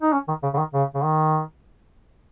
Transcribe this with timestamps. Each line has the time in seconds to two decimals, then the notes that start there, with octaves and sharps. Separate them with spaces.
0.02 D#4
0.13 C#4
0.28 D#3
0.43 C#3
0.54 C#3
0.58 D#3
0.74 C#3
0.95 C#3
1.04 D#3